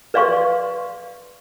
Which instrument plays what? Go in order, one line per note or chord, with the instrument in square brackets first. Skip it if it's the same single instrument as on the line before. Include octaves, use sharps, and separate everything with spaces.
[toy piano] B4 D5 F5 C6 C#6